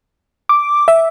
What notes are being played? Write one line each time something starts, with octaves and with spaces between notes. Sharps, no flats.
D6
E5